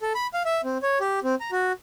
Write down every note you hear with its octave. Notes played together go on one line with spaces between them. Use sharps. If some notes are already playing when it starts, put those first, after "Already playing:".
A4
B5
F5
E5
C4
C#5
G4
C4
A#5
F#4